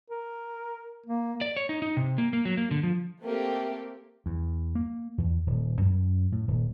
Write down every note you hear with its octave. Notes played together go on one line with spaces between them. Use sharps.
A#4
A#3
D5
C#5
D#4
D#4
C3
A#3
A#3
F#3
A#3
D3
F3
A3 A#3 C4 G4
E2
A#3
E2
D#1
F#2
A2
D#1